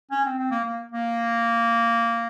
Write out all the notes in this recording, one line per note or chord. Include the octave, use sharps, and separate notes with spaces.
C#4
C4
C4
A#3
A#3
A#3